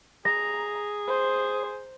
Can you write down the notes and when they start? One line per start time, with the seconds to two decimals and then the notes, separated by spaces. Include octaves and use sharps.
0.25 G#4 A#5 A#6
1.07 C5